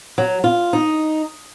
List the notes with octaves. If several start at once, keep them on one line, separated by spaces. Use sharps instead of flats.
F#3
F4
D#4